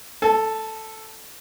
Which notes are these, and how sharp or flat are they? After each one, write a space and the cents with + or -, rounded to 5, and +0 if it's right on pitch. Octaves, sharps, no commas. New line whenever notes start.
A4 +0 A5 -45